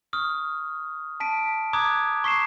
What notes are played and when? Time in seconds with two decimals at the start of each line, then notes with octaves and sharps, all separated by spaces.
0.13 C#6 D#6 F6
1.20 A5 B6 D7
1.73 A#5 D6 D#6 F#6 G#6
2.24 C#6 B6 C7 E7